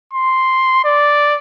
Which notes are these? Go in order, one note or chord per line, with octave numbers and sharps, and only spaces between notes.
C6
D5